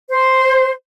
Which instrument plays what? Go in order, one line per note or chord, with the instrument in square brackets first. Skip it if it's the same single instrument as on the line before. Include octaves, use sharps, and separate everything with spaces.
[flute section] C5